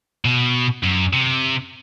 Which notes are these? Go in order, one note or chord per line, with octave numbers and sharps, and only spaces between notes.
B2
F#2
C3